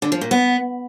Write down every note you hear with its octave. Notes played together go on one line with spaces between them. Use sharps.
D3
F3
A#2
B3